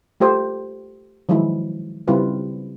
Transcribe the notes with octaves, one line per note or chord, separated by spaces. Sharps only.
A3 F4 G4 C5
D#3 F3 F#3 G#3 E4
C#3 G3 C4 E4 F4 B4